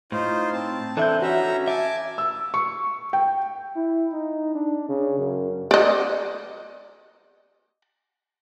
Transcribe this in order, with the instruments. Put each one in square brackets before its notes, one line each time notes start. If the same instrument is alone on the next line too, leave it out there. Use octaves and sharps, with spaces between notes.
[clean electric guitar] A2 [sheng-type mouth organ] D#4 F4 C5
[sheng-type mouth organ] C4 A5
[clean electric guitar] E3 D4 E4 [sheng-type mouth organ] C4 [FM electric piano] A4 E5 G6
[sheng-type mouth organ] C#4 E5 A#5 [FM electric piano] F#4
[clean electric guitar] E5 [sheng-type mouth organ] G#5 A5 D6
[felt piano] E6
C#6
G5
[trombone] E4
D#4
D4
C#3
F#2
[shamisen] D5 D#5